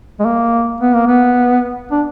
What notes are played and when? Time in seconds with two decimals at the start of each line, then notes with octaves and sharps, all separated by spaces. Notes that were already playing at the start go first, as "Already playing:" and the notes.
0.20 G#3
0.25 A#3
0.81 B3
0.94 A#3
1.07 B3
1.91 D4